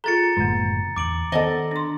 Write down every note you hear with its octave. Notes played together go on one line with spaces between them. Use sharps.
F4 G#4 A4 A#5 A6 C#7
F#1 A2 D3 G#3 A#3
E2 D6 D7 F#7
D#3 B3 A4 C5 D5 D#5 F#5
D4 C6